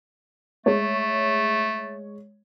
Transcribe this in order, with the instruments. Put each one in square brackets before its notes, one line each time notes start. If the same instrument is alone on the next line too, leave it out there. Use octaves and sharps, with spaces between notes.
[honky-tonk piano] G#3 C#5 [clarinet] A3